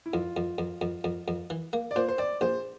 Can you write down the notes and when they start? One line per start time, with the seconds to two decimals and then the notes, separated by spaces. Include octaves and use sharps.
0.06 E4
0.13 F2 F4
0.37 F2
0.58 F2
0.81 F2
1.04 F2
1.28 F2
1.50 E3
1.73 A#3
1.91 D5
1.96 A#2 C5
2.08 C5
2.18 C4 D5
2.41 A#1 C5